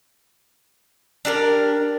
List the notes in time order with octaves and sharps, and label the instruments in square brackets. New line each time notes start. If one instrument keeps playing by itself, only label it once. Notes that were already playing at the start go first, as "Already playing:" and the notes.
[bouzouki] D4 G4 A4 A#4